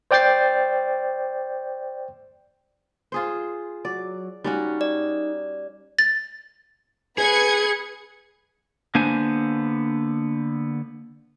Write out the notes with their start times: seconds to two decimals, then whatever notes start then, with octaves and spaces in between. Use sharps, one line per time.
0.11 C5 D5 G5 G6 A6 C7
3.12 F4 G#4 C5
3.85 F#3 D5
4.44 G3 C#4 D#4 F#4
4.81 D5
5.99 A6
7.18 G#4 B4 G#6 C#7
8.95 D3 A#3 B3 D4 C5 G#5